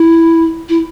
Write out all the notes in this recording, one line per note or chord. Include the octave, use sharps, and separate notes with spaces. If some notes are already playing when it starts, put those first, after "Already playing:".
Already playing: E4
E4